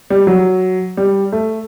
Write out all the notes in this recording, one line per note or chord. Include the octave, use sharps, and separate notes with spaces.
G3
F#3
G3
A3